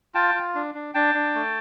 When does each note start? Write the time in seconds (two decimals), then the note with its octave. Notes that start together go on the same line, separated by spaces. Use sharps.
0.15 F4 G5 A5
0.35 F4
0.55 D4
0.74 D4
0.94 D4 G5 A5
1.15 D4
1.35 A3